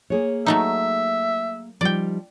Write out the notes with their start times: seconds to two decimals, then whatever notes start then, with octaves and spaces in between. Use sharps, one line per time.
0.10 A#3 G#4 C#5
0.46 F#3 A3 D#4 E5
1.81 F3 G3 D#4 D5 G5